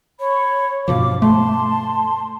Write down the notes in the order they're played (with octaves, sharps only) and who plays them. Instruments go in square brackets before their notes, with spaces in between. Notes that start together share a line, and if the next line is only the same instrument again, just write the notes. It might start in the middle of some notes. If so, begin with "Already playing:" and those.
[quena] C#5 [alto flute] B5
[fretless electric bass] G2 B2 F3 [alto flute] F5 [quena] D6
[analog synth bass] A3 [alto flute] A5 [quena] C6